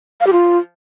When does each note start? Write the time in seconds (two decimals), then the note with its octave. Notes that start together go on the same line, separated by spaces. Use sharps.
0.21 F5
0.27 G4
0.33 F4